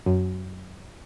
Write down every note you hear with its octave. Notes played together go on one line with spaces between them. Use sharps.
F#2